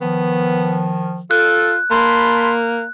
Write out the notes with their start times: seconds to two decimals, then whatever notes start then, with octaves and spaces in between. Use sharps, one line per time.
0.01 D#3 F3 B3
1.31 F4 A4 F#6
1.91 A#3 A5 B5 C6